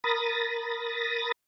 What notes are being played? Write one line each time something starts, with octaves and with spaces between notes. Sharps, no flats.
A#4 B5 D#6 A6 A#6